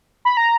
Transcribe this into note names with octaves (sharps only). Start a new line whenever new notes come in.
B5
A#5